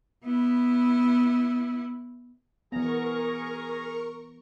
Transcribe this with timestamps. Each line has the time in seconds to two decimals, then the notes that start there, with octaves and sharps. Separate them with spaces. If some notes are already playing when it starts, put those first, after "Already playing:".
0.25 B3 E4
2.72 E3 B3 G#4 A#4 A#5 C#6